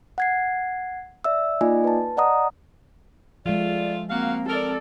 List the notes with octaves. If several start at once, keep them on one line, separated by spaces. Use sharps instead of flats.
F#5 G#6 C7
D5 E5 E6
A#3 D#4 F4 D5 D#5 G#5
B4 A5
D5 D#5 F#5 A#5 D#6
F3 G#3 A3 F4 D5
A#3 C4 F#4 F5 F#5
A4 A#4 D5